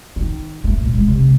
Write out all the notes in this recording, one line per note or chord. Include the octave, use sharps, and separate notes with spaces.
D#3
A3
A#2
G#3
C3